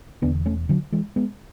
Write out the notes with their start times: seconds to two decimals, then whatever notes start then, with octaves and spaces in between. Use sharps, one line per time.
0.22 E1 E2 D3 B3 D4
0.46 A3 C#4
0.69 D3 F#3
0.92 E3 G#3
1.16 G#3 B3